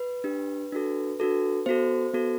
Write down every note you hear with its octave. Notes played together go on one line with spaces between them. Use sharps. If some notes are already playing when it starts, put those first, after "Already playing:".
Already playing: B4
D4 G4
D4 F#4 A4
D4 F#4 A4
B3 F#4 A4 C5
B3 F#4 A4